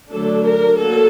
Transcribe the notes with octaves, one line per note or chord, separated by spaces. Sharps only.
D3 F#3 A3 D4 A4
A#4
F#3 A#3 A4